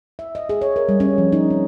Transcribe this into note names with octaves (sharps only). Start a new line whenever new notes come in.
E5
D#5
G#4
C#5
A#4
G3
C#4
F3
D#4
C4